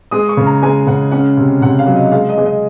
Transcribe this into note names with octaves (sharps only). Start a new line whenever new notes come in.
G#3 D#6
C#6
C#3
A#5
G#3 G#5
C#3 F#5
C#4 F#5
C3
C3 F#5
F5
F#3
D#5
G#3 F5
D#5
G#3
D#5